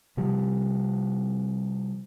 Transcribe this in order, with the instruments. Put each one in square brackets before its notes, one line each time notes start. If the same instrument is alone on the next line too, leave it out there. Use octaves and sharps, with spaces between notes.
[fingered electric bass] C3 F3 G3